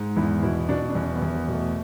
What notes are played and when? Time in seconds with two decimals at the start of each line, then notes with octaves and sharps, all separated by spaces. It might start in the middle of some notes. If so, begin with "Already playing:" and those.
Already playing: G#2
0.16 E2 E4
0.42 B2 E4
0.69 B2 D4
0.89 D4
0.95 E2 C#4
1.15 B3
1.22 E2
1.35 B3
1.48 B2
1.54 A3